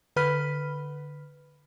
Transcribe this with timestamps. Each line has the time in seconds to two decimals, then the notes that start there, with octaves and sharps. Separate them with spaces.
0.16 D3 B4 B5 F6 B6